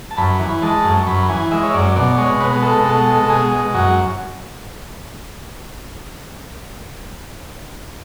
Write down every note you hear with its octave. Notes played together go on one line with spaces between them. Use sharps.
A5
F#2 B5
E3
G#3 A5
F#2
C#6
F#2 B5
E3 G#5
G#3 E5
C#5
F#2 D5
B2 D5
G#3 C#5
B2 B4
B4
G#3 A4
B2 A4
G#3
A4
B2 G#4
G#3
F#2 F#4